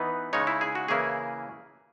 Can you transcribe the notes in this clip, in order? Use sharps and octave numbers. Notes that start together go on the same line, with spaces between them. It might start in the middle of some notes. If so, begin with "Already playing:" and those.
Already playing: E3 B3 D#4 B4
C#3 G#3 D#4 C#5
E4
G#4
F#4
C#3 E3 A#3 E4 G#4